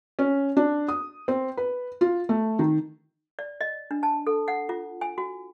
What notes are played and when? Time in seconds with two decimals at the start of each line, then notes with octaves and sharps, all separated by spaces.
0.19 C#4
0.57 D4
0.88 D#6
1.28 C4
1.57 B4
2.01 F4
2.29 A3
2.59 D#3
3.39 D5
3.61 D#5
3.91 D4
4.03 A5
4.27 A4
4.48 F#5
4.69 F4
5.01 G#5
5.18 F#4